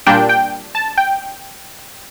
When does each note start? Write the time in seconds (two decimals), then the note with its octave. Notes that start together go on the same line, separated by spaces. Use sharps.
0.06 A#2 G3 A#3 D4 G5
0.29 G5
0.75 A5
0.97 G5